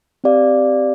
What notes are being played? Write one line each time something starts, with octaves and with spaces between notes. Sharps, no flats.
C4 G4 D5 F5